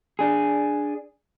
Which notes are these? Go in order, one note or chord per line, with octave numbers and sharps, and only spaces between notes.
D4 G#4